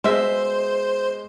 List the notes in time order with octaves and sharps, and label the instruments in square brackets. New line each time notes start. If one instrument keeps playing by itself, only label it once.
[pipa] B2 E5 [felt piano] G#3 G#4 D#5 [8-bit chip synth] C5